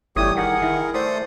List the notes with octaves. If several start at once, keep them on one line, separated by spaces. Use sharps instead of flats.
G1 E3 G3 A3 G4 C#5 G5 D#6
D#3 G#4 A#4 F#5
D#3 E4
A3 C5 D5 C6 D#6